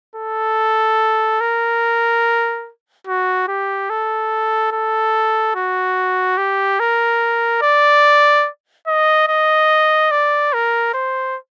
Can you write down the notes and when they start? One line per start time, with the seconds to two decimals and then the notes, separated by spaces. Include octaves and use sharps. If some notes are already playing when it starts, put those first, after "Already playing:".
0.15 A4
1.41 A#4
3.07 F#4
3.48 G4
3.90 A4
4.72 A4
5.55 F#4
6.37 G4
6.80 A#4
7.62 D5
8.87 D#5
9.28 D#5
10.11 D5
10.53 A#4
10.94 C5